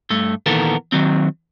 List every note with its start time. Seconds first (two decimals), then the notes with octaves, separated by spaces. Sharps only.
0.10 G2 A3
0.46 A#2 D#3 E3 B3 A4 A#4
0.92 D#3 F#3 C4